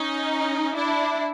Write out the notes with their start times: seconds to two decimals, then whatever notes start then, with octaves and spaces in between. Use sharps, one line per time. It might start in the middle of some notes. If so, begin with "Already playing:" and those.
Already playing: C#4 D#4
0.76 D4 E4